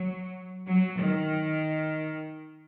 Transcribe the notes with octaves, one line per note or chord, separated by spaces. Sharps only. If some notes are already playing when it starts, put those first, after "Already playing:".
Already playing: F#3
F#3
D#3